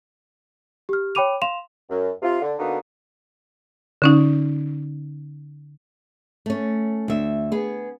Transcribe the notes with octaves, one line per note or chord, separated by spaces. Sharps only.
G4 F6
C#5 G5 B5 D6 D#7 F7
F5 C6 E7 F7
F#2
C3 F4
D3
D3 A#3 B3 D#4 F#4
D3 C#4 D#4
A3 C#4
D2 E5
B3 G#4